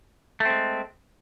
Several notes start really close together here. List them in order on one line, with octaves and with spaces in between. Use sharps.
A3 C4 G#3